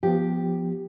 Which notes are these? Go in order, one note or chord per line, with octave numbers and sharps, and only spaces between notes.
F3 B3 G4